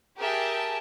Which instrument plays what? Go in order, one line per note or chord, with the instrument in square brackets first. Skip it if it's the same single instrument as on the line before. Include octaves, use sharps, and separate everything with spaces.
[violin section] G4 G#4 A#4 E5 G5 A5